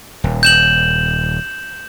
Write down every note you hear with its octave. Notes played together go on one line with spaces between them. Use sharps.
D#1
G6 E7 F#7